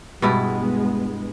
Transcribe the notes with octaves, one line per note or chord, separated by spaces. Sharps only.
G2 B2 G#3 B3 E4